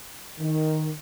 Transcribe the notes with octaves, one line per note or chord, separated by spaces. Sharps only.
D#3